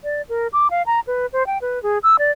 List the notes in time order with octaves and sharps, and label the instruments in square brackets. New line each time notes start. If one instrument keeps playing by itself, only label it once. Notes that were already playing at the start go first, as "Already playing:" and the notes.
[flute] D5
A#4
D6
F5
A#5
B4
C5
G5
B4
G#4
E6
D5